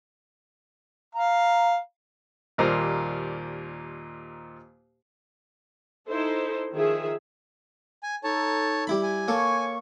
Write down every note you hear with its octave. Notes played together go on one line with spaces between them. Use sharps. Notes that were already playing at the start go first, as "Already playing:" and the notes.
F5 A#5
D#2 A#2 G3 A#4 C5 A#5
D#4 E4 A4 C5
D#3 F3 G#4 E5
G#5
D#4 A4 C#5 A5
G3 E4 B5
G#5
A#3 A4 C#5 C#6